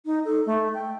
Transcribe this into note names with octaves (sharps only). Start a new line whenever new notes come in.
D#4
A4
A3
G5